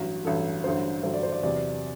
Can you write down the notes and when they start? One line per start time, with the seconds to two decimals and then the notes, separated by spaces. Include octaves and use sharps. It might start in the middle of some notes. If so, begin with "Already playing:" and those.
Already playing: A1 G2 F#3
0.25 A1 G2 F#3 A4
0.64 A1 G2 D3 F#3 C5
1.03 A1 G2 D3 F#3 C5
1.14 D5
1.23 C5
1.32 D5
1.43 E2 C3 F#3 D5